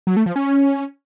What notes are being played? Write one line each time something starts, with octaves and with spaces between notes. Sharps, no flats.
F#3
A3
F3
C#4